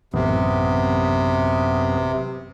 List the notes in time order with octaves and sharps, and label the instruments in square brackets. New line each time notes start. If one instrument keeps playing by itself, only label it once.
[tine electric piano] A1 [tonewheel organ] F#2 B3 [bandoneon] C3